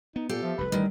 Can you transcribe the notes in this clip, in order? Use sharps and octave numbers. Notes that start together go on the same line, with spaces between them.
B3 D#4
A#2 G4 A4 F5
F3 E5
F1 C2 B4 B5
A1 A#2 D#3 G3